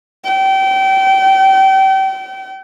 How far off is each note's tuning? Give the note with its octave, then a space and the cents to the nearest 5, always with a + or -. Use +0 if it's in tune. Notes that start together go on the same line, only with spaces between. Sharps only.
G5 -30